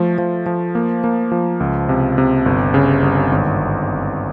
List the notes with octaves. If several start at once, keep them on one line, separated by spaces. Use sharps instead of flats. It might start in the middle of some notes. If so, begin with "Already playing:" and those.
Already playing: F3 A3
F3
F3
A#3
A#3
F3
C#2
C3
C3
G1
C#3
G1
G#1